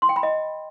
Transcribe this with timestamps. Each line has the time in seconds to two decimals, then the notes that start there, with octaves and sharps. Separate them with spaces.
0.02 C6
0.09 G5
0.16 B5
0.23 D#5